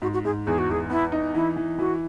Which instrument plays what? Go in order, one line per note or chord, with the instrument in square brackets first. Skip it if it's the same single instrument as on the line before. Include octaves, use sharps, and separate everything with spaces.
[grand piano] G#2 [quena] F#4
[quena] F#4
[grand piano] G#2 [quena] G#4
[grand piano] E2 [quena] G#4
[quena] F#4
[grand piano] E2 [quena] G#4
[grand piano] B3 [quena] E4
[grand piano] D#4
[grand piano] E3 [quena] E4
[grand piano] E3
[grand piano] E3 [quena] F#4